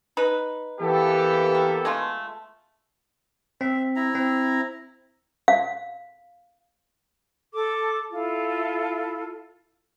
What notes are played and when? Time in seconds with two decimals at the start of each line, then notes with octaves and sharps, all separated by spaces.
0.17 D#4 B4
0.80 E3 A#3 B3 G4 A4
1.55 A#4
1.85 G#3 A3 F4
3.61 C4 E5
3.96 E4 A#5
4.15 C4
5.48 F5
7.53 A4 D6
8.11 E4 F4 A4